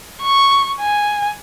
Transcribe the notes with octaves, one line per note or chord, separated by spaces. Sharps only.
C#6
G#5